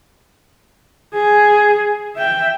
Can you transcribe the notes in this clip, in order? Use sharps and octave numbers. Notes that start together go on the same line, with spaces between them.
G#4
E5 G5